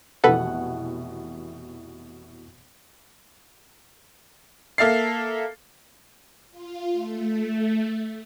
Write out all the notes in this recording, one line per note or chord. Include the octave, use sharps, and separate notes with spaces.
F1 B2 E3 A4 B4 F#5
A#3 A4 E5 F6 A6 C7
F4
A3